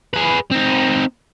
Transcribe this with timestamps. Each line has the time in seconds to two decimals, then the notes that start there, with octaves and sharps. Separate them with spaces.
0.13 G#4 B4
0.51 C4 D#4